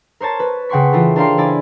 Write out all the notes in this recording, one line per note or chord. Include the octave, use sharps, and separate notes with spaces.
A#4 C5 C#5 A5
B4
C#3 F#5 G5 C6 C#6 B6
E3 E4 F4 A4
D4 A#4 C5 F5 G5 C6
E4 D5 G#5 B5